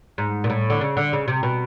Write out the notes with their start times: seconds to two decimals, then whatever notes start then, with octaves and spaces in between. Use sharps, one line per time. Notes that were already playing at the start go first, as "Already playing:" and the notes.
0.18 G#2
0.44 A#2
0.50 A2
0.70 D3
0.81 C#3
0.97 D3
1.13 C#3
1.28 C3
1.43 B2